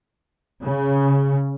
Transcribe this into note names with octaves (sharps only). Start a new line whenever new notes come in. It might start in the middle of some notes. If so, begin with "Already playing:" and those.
C#3